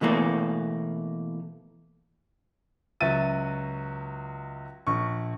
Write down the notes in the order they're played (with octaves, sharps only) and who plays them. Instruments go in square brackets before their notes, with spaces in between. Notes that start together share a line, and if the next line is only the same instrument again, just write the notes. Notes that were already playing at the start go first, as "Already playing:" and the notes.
[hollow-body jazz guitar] B2 E3 A3 A#3
[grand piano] C#2 F#3 F#4 E5 A6 D#7
A#1 C#6